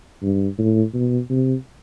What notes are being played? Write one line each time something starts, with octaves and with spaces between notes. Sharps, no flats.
G2
A2
B2
C3